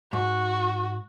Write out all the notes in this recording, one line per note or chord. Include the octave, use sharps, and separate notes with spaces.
G#2 F#4